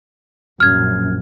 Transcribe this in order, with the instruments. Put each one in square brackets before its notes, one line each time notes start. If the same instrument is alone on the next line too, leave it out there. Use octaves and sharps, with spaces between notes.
[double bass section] A#1 F#2 [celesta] F6 G#6